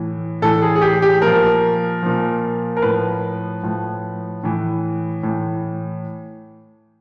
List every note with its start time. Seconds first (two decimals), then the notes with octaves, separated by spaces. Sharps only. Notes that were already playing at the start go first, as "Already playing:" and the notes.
Already playing: A2 E3
0.42 A2 E3 A4
0.62 G#4
0.76 G#4
0.82 G4
1.02 G4
1.22 A#2 F3 A#4
2.03 A#2 F3
2.77 A#4
2.82 A2 F3 B4
3.63 A2 F3
4.43 A2 E3
5.23 A2 E3